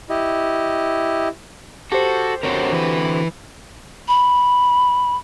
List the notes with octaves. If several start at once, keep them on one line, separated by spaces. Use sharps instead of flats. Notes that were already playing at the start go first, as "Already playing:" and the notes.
E4 G4 D#5
F#4 G4 A4 C5
D3 C4 F#4 A#4 C#5
E3 B4
B5